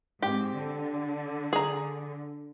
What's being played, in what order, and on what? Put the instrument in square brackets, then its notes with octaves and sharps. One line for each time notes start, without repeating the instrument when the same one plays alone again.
[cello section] G#2 C4 [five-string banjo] G4
[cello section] D3
[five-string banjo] G#4 A#5